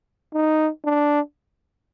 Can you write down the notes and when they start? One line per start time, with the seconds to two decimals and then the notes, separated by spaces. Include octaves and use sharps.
0.33 D#4
0.85 D4